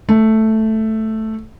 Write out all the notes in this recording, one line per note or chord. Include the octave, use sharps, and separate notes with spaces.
A3